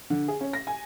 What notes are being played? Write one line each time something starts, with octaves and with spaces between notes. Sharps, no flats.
D3
G#4
C#4
A#6
G#5